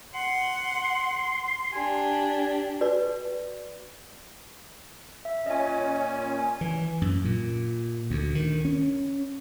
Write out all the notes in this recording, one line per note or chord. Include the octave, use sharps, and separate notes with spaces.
F#5 C6
D4 G4 G#5
F#4 B4 D5
E5
A#2 C#4 D#5 G#5
G#5
E3
F#2
A#2
D2
D#3
C#4